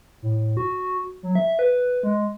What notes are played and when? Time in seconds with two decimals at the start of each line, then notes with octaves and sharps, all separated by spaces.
0.22 A2
0.57 F#4
1.23 F#3
1.35 E5
1.59 B4
2.03 G#3